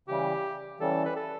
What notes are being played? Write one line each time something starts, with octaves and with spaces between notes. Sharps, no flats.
C#3 E3 G3 G4
C#3 E3 G3 A4
B4
A4